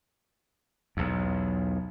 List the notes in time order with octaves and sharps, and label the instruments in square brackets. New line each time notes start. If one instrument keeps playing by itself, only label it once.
[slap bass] B1 E2